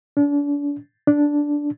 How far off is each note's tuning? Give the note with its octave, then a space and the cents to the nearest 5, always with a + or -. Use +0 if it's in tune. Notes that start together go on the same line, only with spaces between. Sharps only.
D4 -35
D4 -5